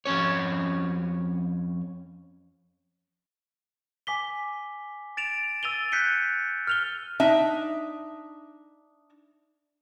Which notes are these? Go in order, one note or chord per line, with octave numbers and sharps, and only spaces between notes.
F2 B2 C#4 C#5
G#5 D6 B6 G7
A6 D7 E7 F7
E6 A6 D#7 F7 G7
F#6 G6 B6 C#7 D#7 G7
F6 F7 G7
D4 D#4 E5